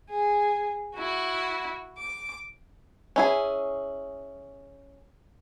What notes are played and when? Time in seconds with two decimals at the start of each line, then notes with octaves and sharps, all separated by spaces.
0.10 G#4
0.95 E4 F#4
1.98 D6
3.16 C#4 E4 G#4